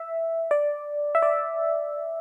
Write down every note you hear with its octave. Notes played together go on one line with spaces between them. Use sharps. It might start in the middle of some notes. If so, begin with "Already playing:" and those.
Already playing: E5
D5
E5
D5